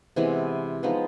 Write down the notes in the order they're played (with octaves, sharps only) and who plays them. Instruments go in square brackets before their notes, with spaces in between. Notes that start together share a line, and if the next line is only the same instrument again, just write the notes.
[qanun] C3 E3 G#3 B3
F3 G#3 B3 D#4